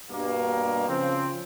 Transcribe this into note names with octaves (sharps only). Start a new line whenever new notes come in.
G2 B2 A#3
C#3 F3 C4